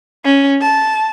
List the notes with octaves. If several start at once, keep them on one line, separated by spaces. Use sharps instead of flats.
C#4
A5